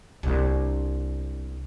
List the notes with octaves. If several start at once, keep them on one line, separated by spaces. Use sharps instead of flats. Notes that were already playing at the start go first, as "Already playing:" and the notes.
C2 D4